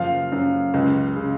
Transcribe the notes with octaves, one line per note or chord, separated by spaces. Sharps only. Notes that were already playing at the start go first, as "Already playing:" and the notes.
Already playing: F#1 F3 F5
F#2
C#2
C#3